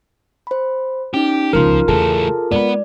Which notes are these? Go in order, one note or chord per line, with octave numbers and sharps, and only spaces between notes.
C5 B5
C#4 D#4 G4
E1 C#2 F3 F4 A#4
E2 C#3 E3 A3 G#4 A4 A5
G#3 B3 D#4 B4 D5